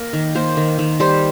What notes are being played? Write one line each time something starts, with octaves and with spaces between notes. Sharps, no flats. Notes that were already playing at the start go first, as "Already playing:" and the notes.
Already playing: A#3 A#4
D#3
A#3 C5
D#3
D#3
G3 C5